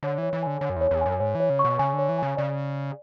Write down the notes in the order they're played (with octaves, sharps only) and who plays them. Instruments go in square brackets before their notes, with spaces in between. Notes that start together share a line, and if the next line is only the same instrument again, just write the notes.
[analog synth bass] D3 [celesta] C#5
[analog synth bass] E3 [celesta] C#5
[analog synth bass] E3
[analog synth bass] D3 [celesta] G#5
[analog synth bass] D3 [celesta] C#5
[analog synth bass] F#2
[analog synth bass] E2 [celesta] C#5
[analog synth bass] E2
[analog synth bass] F#2 [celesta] G#5
[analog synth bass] G#2 [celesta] C#5
[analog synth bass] E3
[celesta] C#5
[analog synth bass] C#3
[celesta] C#6
[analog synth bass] B2
[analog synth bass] C#3 [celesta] G#5
[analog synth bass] D3
[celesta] C#5
[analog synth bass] E3
[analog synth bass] C#3 [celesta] G#5
[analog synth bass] C#3 [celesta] D5